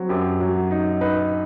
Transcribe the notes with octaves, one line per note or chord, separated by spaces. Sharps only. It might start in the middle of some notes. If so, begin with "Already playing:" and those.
Already playing: F#3 C4
F#2 G4
F#3
D#4
D#4 B4